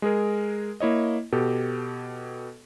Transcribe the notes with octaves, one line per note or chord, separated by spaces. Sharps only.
G#3 G#4 A#4
A#3 E4 C#5 D#5
B2 G4 A4